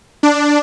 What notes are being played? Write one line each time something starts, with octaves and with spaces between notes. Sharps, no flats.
D4